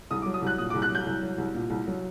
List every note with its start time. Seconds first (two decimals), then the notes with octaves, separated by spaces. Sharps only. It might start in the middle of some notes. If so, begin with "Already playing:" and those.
0.11 C2 D#6
0.22 D6
0.26 F#3
0.34 D#6
0.42 C2 F#6
0.58 A#2 D#6
0.70 D6
0.75 C2
0.82 F#6
0.90 F#3 G6
1.06 C2
1.22 F#3
1.38 C2
1.54 A#2
1.70 C2
1.87 F#3